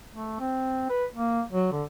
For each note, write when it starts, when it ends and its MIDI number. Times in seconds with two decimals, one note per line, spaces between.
0.13 0.35 57
0.40 0.89 60
0.90 1.05 71
1.13 1.42 58
1.52 1.68 54
1.72 1.83 50